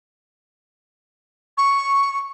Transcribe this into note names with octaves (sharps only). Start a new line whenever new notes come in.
C#6